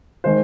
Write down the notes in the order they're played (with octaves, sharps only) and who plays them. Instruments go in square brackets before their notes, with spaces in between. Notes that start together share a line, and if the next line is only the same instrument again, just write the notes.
[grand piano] D#3 G#3 C5